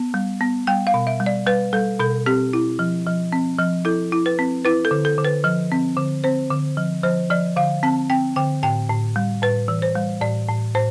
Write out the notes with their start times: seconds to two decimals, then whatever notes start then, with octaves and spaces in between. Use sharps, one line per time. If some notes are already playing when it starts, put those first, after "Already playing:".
Already playing: B3
0.14 G3
0.41 B3
0.67 G3 G5
0.87 F5
0.94 B2
1.07 E5
1.20 G3
1.26 D5
1.47 G3 B4
1.73 G3 A4
1.99 B2 A4
2.26 C4 G4
2.53 E4
2.79 F3
3.06 F3
3.33 C4
3.59 F3
3.85 E4 A4
4.12 E4
4.26 B4
4.39 C4
4.65 E4 B4
4.85 A4
4.91 D3
5.05 A4
5.18 D3
5.25 B4
5.44 F3
5.72 C4
5.97 D3
6.24 C4 C5
6.50 D3
6.77 F3
7.04 F3 C5
7.30 F3 D5
7.56 D3 F5
7.83 C4 A5
8.10 C4 G5
8.36 D3 G5
8.63 A2 G5
8.89 A2
9.16 G3
9.42 A2 B4
9.68 E3
9.82 C5
9.95 G3
10.21 A2 D5
10.49 A2
10.75 A2 C5